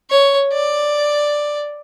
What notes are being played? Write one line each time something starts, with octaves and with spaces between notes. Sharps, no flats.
C#5
D5